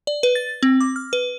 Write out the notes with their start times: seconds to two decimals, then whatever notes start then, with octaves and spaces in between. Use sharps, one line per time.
0.07 D5
0.23 B4
0.35 A6
0.63 C4
0.81 D6
0.96 F6
1.13 B4